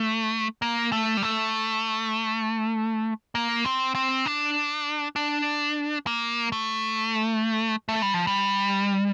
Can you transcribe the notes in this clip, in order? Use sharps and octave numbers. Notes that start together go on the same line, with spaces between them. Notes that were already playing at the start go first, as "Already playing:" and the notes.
Already playing: A3
A#3
A3
G3
A3
A#3
C4
C4
D4
D4
A#3
A3
A3
G3
F3
G3